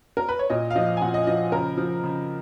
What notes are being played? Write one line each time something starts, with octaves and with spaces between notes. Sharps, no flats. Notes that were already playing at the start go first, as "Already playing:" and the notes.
A#4
B4
C#5
A#2 D#5
F5
F3 D#5
G#5
A#2 F#5
D#5
F3 D#5
C#3 A#4
F3
C#3